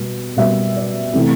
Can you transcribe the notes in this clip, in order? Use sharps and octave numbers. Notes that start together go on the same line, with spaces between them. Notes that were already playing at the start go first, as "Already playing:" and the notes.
Already playing: B2 G3 A#3
B2 G3 A#3 E5
D5
C3 E3 A3